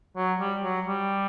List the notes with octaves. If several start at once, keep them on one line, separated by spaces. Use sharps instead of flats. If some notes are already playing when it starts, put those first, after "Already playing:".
F#3
G3
F#3
G3